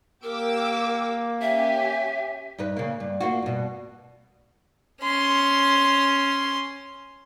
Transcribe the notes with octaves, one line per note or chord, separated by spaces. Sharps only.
A#3 G4 A#4 D6 E6
C#4 G4 E5 G#5
G2 D#4 B4
C#3 A#3
G2
A#3 F4 F#4
G2 B2
C#4 C6